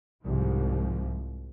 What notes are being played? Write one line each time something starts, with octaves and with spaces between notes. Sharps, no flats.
C2 G#2 F3